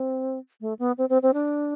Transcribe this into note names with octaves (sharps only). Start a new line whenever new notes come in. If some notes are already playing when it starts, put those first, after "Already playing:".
Already playing: C4
A3
B3
C4
C4
C4
D4